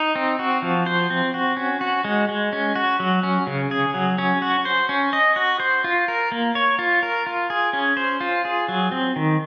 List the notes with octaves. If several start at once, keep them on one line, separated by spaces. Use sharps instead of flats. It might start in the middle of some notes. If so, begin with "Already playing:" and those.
Already playing: D#4
C4
F#4
F3
C5
C4
F#4
C#4
F#4
G#3
G#3
C#4
F#4
F#3
C#4
C#3
G#4
F#3
C#4
F#4
C5
C#4
D#5
F#4
C5
F4
A#4
A#3
C#5
F4
A#4
F4
G#4
C#4
C5
F4
G#4
F#3
C4
D#3